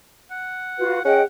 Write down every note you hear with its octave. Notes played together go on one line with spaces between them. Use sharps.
F#5
F4 F#4 B4
C#4 G#4 D#5 F#5 G5